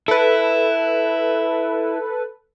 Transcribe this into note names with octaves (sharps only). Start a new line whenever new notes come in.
E4 A4 B4